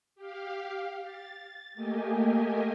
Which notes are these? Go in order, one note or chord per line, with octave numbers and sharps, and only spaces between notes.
G4 F5
A6
A3 A#3 G4 D#5 G#5